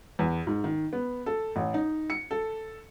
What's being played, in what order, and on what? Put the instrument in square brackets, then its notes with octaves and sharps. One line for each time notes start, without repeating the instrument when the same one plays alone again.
[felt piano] E2
G#2
D#3
B3
A4
A1
D#4
C#7
A4